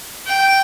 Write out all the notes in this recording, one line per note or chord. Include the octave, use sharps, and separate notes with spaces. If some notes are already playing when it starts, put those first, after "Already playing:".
G5